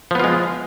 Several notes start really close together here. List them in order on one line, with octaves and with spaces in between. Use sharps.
F3 B3 F4 G#3